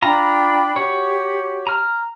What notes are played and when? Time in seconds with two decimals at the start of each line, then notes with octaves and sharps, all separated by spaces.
0.02 D4 F4 G5 A#5 B5
0.76 F#4 G4 C#5
1.67 A#5 F6